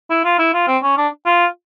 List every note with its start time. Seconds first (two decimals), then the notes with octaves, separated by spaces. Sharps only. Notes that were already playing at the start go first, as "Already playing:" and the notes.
0.10 E4
0.24 F4
0.39 E4
0.54 F4
0.68 C4
0.83 C#4
0.97 D4
1.26 F4